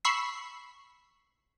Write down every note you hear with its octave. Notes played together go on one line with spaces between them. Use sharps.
B5 C#6 E6 C7